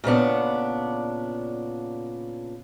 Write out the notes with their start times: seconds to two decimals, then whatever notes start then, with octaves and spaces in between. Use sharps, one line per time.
0.04 A#2 C#3 B3 D4